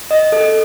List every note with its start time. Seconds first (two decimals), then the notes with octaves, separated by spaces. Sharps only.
0.11 D#5
0.32 A4